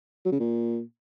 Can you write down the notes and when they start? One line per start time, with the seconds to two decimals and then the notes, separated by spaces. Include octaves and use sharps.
0.25 F#3
0.32 C#3
0.39 A#2